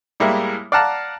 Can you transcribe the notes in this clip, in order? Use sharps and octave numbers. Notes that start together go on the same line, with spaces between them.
A2 G3 G#3 A#3 E4
D5 F5 F#5 A5 A#5